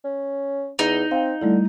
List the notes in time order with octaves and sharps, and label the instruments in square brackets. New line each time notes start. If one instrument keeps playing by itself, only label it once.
[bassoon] C#4
[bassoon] E2 [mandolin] D#4
[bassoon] C4 [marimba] F5 G5
[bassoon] D3 [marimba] G3 A3 E4